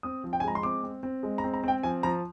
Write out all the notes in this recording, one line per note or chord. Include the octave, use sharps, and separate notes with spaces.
C4 D#6
F3
G5
G#5
G#3 A#5
C6
C4 D6
C4
C4
G#3
A#5
C4
A#5
C4 G5
F3 G#5
F3 A#5